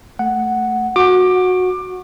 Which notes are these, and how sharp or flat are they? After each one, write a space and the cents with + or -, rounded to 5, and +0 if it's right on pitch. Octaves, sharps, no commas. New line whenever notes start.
A3 +0 F#5 +0
F#4 -15 D6 +20